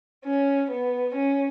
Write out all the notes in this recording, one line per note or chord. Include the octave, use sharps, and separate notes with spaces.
C#4
B3
C#4